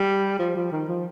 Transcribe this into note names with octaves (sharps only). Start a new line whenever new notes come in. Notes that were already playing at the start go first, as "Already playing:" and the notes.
Already playing: G3
F3
F3
D#3
F3